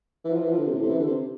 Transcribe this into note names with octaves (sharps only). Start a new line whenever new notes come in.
E3
F3
E3
F3
D3
C3
A2
C3
E3
D3
C3